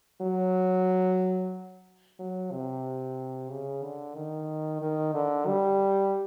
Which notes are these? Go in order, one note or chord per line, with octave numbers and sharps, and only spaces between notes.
F#3
F#3
C3
C#3
D3
D#3
D#3
D3
G3